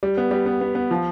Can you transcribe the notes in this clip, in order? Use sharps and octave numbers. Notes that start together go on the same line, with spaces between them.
G3
B3
G3
B3
B3
B3
F3